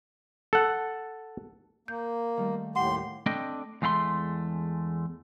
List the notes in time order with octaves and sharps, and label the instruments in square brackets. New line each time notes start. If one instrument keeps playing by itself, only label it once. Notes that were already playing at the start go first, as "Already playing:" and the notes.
[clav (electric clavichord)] A4 F#5
[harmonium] A#3 [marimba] G6
[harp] D#3 G3 A3
[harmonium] D#2 A2 G4 [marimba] F#5 [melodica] C6
[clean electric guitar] A3 C4 D4 D#5 G5
E2 G#3 A3 F5 C6